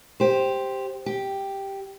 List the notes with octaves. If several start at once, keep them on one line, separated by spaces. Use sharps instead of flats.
G4 C5
G4